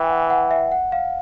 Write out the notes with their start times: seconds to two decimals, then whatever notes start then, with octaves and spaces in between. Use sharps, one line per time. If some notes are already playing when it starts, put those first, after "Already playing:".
Already playing: E3 E5 G5 G#5
0.10 F#5
0.30 F#5
0.51 E5
0.72 F#5
0.92 F5